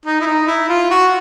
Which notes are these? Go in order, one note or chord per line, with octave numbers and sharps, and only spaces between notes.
D#4
E4
D#4
E4
F4
F#4